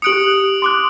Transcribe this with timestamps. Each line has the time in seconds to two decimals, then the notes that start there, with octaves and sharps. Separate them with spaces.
0.02 G4 D#6 F#6 C#7 D7 F#7
0.62 C6 D6 F#6